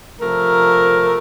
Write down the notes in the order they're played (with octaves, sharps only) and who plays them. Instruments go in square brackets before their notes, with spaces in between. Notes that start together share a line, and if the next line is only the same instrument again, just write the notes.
[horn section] C3 F3 A3 A#4